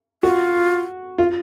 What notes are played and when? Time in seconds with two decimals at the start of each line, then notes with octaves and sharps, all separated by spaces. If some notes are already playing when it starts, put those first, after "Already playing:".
0.23 F4 F#4
1.18 F4